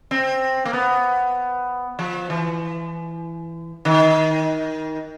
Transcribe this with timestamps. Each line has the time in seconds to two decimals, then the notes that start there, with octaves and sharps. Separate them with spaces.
0.11 C4
0.66 A#3
0.73 B3
1.99 F3
2.30 E3
3.85 D#3